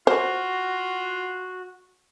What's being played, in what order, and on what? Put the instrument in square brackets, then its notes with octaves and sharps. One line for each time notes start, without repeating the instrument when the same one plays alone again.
[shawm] F4 [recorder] F#4 [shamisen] C5